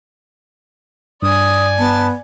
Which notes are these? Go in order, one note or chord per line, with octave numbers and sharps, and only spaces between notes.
G2 D5 G#5 D#6
B3 A5